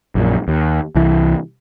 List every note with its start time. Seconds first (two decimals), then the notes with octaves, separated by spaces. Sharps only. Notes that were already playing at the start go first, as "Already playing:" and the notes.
0.15 A#1 F#2 A#2
0.48 D#2
0.95 C2 E3